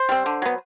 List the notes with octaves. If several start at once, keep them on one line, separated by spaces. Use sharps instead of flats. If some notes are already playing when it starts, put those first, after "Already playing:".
Already playing: C5
G3 C4
D3
F#3 B3